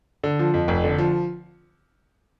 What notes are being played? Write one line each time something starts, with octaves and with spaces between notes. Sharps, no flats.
D3
F3
F2
F1
D3
F3